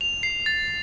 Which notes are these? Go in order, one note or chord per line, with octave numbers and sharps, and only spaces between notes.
F7
C7
A6